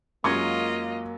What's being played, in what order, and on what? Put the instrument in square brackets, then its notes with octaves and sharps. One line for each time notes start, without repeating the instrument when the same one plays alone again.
[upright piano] F#2 F#3 G#3 [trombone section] A#3 [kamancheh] F4 D#5 [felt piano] C#6 G#6